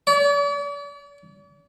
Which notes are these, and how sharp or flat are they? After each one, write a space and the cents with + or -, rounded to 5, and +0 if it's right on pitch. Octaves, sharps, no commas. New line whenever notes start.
D5 -45